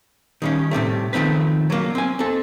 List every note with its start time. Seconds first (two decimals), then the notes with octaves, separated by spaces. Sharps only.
0.42 D#3 G3 C#4
0.71 A2 C3 G3 A3
1.13 D#3 F3 A3 C4 B4
1.70 F#3 A#3
1.95 C4 G#5
2.19 C4 A4